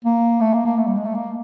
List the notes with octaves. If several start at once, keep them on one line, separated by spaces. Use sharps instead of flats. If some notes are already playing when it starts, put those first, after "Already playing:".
A#3
A3
A#3
A#3
A3
G3
G#3
A3
A#3